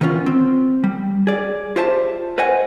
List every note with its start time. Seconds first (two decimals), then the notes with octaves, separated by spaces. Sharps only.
0.01 D#3 E3 B3 C#4 F4
0.26 C4
0.84 G3
1.27 G#4 D5
1.76 F4 G4 C5 E5 G5 A5
2.38 B4 C5 D#5 F#5 G#5